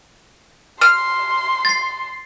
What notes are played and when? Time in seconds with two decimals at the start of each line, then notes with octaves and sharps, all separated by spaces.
0.81 C6 F6
1.65 A6 C7